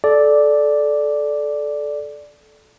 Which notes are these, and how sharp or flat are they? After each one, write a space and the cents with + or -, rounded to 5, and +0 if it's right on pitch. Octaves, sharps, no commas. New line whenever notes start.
A4 -20 D5 +0